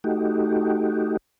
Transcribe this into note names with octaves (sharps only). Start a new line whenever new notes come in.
A3 D#4 F#4 G4